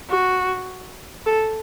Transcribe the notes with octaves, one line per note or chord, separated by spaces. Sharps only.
F#4
A4